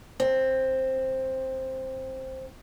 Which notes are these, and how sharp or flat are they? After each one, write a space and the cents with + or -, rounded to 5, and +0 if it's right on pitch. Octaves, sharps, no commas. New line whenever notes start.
C4 +10